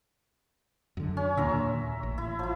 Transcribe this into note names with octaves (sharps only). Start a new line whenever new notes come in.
F#2 D3
C#4
D#2 A#2 D3 E5 A#5 C6
A1
E4
F3 E4